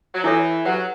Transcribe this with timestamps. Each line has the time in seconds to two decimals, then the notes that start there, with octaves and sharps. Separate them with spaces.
0.15 F#3
0.24 E3 E4 A4 C#5 E5
0.66 F#3 G4 B4 F#5